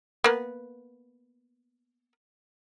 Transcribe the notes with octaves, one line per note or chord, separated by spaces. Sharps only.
A#3 B3